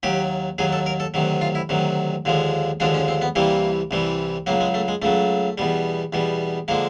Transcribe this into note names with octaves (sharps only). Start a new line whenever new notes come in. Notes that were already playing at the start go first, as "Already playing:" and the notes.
D#2 D#3 F#3 G4
D#2 D#3 F#3 G#4
A4
A#4
A4
D2 C3 D#3 F#3
F4
E4
D2 C3 D#3 F#3
D#2 D3 F3 G#3
D#2 D3 F3 G#3 D4
C#4
C4
B3
C2 C3 E3 G3 A#3
C2 C3 E3 G3
C#2 C#3 F#3 A#3
G#3
A3
G#3
C#2 C#3 F#3 A3
E2 B2 G3
E2 B2 G3
D3 F3 G#3 A#3